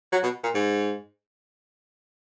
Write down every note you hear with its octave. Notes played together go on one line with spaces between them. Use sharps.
F#3
B2
A#2
G#2